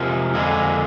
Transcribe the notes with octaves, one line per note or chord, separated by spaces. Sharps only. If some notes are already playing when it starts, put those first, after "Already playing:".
Already playing: C3 F3 G#3 A#4
F2 D3 G#3